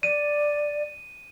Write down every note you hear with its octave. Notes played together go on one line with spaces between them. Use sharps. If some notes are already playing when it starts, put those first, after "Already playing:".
D5 D#7